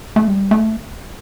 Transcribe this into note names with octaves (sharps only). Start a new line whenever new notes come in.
A3
G3
A3